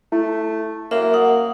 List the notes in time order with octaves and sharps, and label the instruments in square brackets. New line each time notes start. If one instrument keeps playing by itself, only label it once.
[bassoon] A3 [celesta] E4
[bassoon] F#2 [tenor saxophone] A#3 [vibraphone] E5
[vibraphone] F#5 [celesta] D#6